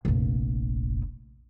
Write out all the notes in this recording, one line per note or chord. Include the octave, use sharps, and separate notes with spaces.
F1 A#1